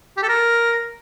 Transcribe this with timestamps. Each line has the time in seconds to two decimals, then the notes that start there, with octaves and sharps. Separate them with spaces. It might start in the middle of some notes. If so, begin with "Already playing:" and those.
0.17 G4
0.23 A4
0.29 A#4